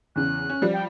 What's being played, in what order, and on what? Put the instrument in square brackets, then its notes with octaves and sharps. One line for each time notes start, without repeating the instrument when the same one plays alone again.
[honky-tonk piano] E2 C#3 [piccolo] F#6
[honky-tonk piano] C#4
F3 G3
[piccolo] G5